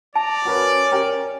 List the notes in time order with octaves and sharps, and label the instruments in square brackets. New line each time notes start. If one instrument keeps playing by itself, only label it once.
[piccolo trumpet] D5 [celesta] A5 [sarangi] A#5
[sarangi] C#4 [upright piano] F#4 A#4 B4
[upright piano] G4 A#4 G5